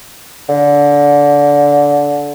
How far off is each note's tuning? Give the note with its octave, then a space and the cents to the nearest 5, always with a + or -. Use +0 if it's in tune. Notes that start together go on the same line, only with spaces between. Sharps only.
D3 -20